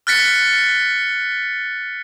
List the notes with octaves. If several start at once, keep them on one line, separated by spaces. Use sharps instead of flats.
F6 F#6 A6 B6 C#7